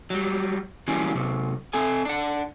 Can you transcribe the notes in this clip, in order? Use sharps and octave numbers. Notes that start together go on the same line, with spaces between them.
F#3 G3
E3 F#3 G3 A#3 C#4 E4
C3 F#3
C4 A4 G#5
D4 F#5